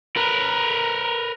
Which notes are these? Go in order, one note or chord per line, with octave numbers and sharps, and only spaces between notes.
A#4 B4